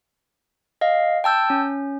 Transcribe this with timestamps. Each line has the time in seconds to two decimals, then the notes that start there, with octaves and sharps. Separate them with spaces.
0.81 D#5 F5
1.24 G5 A5 E6 G6
1.50 C#4